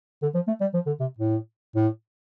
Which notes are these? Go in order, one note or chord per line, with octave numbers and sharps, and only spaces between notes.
D3
F3
A3
G3
F3
D3
C3
A2
A2